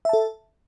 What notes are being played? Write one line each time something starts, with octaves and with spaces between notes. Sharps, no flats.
A4 E5 A5